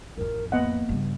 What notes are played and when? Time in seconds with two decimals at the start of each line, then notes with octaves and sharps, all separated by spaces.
0.17 A1 F2 A#4
0.52 A#3 B3 D#5 F#5
0.89 G2 C#3